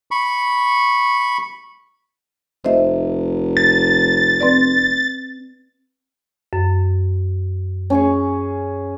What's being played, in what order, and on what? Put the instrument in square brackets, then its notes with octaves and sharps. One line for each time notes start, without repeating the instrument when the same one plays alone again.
[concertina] B5 C#6
[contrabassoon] F1 [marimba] C5 D#5 E5
[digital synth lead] A6
[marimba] C4 B4 D5
F#2
[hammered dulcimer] C#4 G#4 C#6